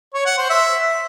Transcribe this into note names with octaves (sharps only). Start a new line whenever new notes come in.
C#5
F#5
C5
E5